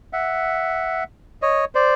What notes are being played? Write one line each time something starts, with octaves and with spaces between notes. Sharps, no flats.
E5 F#5
C#5 D#5
C5 D5